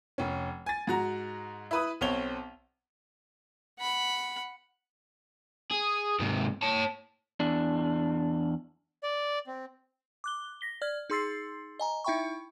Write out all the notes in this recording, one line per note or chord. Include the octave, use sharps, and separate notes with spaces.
F1 C#4
G#5 A6
G#2 F#4 A#5
E4 B4 D#6
B1 C4 C#5 F7 G7
F#5 B5
G#4
G#2 C3
C#5 A5
E2 D4
D5
C4
D6 F#6 G7
A#6 B6 G7
D5 F6 G#6
D#4 G#4 C6 E6 A6 C7
D#5 G#5 A#5
D#4 E4 E5 G5 B5 C#6